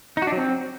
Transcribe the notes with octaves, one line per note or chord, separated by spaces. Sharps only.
D#4
F#4
D4
F#3
C4